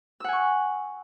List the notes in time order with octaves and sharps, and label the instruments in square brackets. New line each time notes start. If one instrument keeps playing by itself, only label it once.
[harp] E6
F#5
G#5
C#6